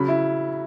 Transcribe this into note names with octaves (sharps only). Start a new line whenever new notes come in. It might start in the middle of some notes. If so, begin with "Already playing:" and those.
Already playing: C#3 F#3 B5
E4